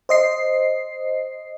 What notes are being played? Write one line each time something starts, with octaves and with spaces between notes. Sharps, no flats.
C5 D#5 C7